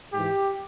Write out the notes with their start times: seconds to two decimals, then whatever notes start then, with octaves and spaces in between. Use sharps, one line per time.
0.13 G#2 E3 G4